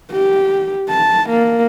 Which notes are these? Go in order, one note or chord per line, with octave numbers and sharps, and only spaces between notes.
G4
A5
A#3